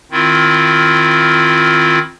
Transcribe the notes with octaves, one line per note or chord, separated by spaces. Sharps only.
D#3 C4 E4 F4